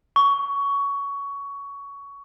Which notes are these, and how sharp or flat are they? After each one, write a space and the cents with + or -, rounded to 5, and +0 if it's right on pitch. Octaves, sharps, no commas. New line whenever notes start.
C#6 +15